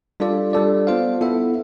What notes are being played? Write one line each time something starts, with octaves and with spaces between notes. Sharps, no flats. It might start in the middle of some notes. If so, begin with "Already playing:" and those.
G3 D4 F4 A4 D5
G3 D4 A4 D5
B3 F4 C5 F5
B3 E4 A4 E5